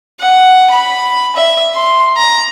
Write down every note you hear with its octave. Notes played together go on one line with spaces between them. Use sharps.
F#5
B5
E5
C6
A#5